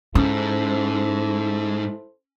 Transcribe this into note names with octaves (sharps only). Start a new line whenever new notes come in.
G#2 C#4 E4 A4 C5